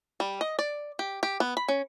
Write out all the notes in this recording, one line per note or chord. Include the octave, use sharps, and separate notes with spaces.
G3
D#5
D5
G4
G4
B3
B5
C#4